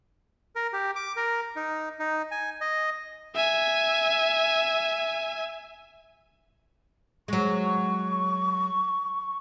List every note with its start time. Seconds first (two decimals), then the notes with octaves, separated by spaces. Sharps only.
0.55 A#4
0.73 G4
0.96 D6
1.16 A#4
1.56 D#4
1.99 D#4
2.31 G#5
2.61 D#5
3.36 E5 G#5
7.28 F#3 G#3 C#6